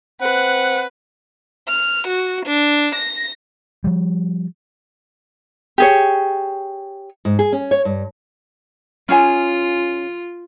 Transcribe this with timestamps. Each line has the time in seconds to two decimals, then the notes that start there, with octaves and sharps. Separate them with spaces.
0.21 C4 B4 F#5
1.68 F6
2.08 F#4
2.46 D4
2.95 A#6
3.84 F3 G3
5.78 G4 G#4 C#5
7.25 G#2
7.39 G#4
7.53 C#4
7.71 C#5
7.85 G2
9.09 C#4 F4 G#4 G#5